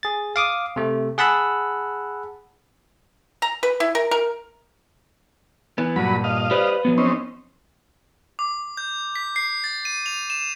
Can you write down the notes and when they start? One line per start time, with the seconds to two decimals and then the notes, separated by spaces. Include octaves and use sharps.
0.03 G#4 A6
0.36 F5 D6 D#6
0.76 C3 A3
1.18 G#4 F#5 A5 B5 E6
3.42 A#5
3.63 B4
3.80 E4
3.95 A#4
4.11 A#4
5.78 E3 B3
5.96 G2 A#2 F#3 B5
6.24 D#5 F5
6.51 G4 B4 C5 D5
6.85 F3 F#3 B3
6.98 C4 C#4 D#4
8.39 D6
8.77 G6
9.16 B6
9.36 C7
9.64 A6
9.85 D#7
10.06 F7
10.30 E7